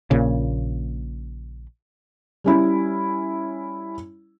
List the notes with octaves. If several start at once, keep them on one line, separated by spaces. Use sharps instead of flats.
A#1 A#2 C#3
G3 C#4 E4